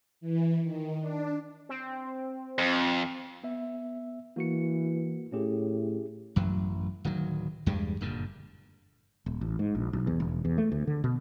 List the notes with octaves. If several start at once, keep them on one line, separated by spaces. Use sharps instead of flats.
E3
D#3
D4
C4
F2
B3 E5
E3 A#3 F#4 C#7
A2 C#4 G4 G#4
A1 F#2 F#3
D1 D#3 F#3
E2 G2 G3 G#3
F#1 G2 A#2 D3
D#1
A1
G#2
A#1
B1
E2
E1
E2
A3
D2
D3
B2